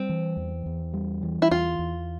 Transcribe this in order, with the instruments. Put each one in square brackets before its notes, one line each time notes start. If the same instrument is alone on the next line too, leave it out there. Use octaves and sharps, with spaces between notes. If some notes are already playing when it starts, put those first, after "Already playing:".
Already playing: [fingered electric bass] G3 [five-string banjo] C4
[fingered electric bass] E3
E2
E2
G3
E3
[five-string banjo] E4
[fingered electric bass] E2 [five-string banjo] F4
[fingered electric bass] E2